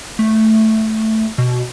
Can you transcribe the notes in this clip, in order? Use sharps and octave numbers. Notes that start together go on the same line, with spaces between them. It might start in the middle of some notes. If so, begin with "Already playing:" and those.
A3
B2